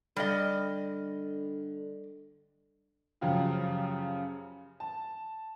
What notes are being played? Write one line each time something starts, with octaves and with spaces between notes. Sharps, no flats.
D3 G3 D5 D#5
F#2 C#3 F3 F4 G4
A5